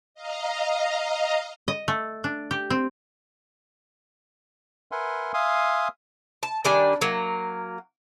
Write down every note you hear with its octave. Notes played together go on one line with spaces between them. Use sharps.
D#5 F5 A#5
D#5
A3
D4
G4
C4
A#4 B4 E5 F#5 G#5 C6
E5 F5 G#5 C6 D#6
A5
D#3 G3 D4 G#5
F#3 A#3